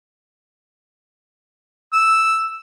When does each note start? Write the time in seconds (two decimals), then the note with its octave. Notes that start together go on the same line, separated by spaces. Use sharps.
1.93 E6